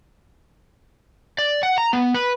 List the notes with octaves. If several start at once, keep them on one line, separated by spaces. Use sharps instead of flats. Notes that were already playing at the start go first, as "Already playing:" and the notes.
D5
F#5
A#5
B3
B4